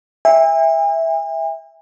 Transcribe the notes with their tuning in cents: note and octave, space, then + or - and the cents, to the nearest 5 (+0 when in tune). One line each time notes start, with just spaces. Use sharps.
E5 -5 G#5 -45